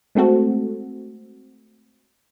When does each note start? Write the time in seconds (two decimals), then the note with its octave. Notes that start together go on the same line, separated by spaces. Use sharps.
0.15 G#3 A3 C4 F#4 A4